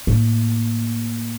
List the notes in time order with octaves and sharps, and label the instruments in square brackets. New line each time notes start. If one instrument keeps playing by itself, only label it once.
[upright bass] A2 A#3